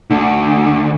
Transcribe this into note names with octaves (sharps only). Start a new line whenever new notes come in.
D2 D3